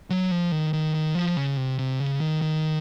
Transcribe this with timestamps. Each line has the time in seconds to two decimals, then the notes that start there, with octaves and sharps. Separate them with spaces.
0.10 F#3
0.31 F3
0.52 D#3
0.73 D#3
0.94 D#3
1.15 F3
1.36 C#3
1.57 C3
1.79 C3
2.00 C#3
2.21 D#3
2.42 D#3